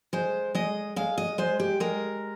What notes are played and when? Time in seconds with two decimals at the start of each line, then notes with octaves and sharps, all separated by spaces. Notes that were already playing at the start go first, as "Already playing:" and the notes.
0.13 G#3 C5
0.55 G#3 D#5
0.96 G#3 F5
1.18 D#5
1.38 G#3 C5
1.60 G4
1.80 G#3 A#4